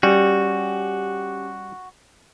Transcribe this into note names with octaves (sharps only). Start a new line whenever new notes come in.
G3 C#4 F#4 G4